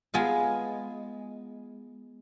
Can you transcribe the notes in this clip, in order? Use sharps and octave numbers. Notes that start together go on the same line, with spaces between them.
G#3 B3 F4